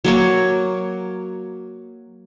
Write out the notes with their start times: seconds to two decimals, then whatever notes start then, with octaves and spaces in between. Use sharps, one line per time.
0.04 F#3 A#3 C#5